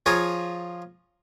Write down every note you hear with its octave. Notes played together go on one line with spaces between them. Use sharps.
F3 F4 G#4 C#5 G#5 A#5